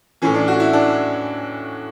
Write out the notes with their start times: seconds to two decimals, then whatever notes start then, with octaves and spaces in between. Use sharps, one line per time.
0.22 A2 E3 C#4
0.34 D4
0.48 F#4
0.60 E4
0.73 D4